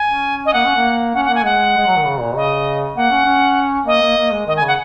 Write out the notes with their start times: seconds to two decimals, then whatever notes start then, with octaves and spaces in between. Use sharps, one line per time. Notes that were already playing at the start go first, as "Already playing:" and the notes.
Already playing: G#5
0.09 C#4
0.46 D#5
0.53 A#3 F#5
0.65 C#4
0.76 A#3
1.14 C#4 F#5
1.25 F#5
1.29 A#3
1.35 G#5
1.44 G#3 F#5
1.77 G#3
1.87 F#3
1.96 D#3
2.05 C#3
2.21 A#2
2.36 C#3 D#5
2.96 A#3 F#5
3.10 C#4
3.26 C#4
3.86 A#3 D#5
4.02 A#3
4.17 A#3
4.31 G#3
4.47 D#3 D#5
4.57 G#5
4.62 C#3
4.68 F#5